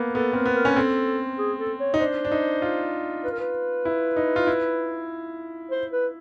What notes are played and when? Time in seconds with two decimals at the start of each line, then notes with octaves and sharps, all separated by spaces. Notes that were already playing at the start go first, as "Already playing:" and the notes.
Already playing: A#3 B3
0.15 B3 A4
0.33 C4 A#4
0.46 B3
0.55 A#4
0.65 C#4
0.76 C4 A4
1.38 G#4
1.58 A4
1.80 C#5
1.94 D#4
2.00 D4 C5
2.25 D4
2.32 D#4
2.62 F4
3.24 B4
3.32 A#4
3.39 B4
3.85 E4
4.17 D#4
4.36 F4
4.47 E4
5.71 C5
5.92 B4